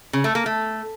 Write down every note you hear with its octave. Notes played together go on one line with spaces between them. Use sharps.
C#3
A3
A#3
A3